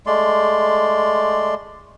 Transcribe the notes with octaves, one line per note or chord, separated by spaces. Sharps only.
G#3 A3 D5 C6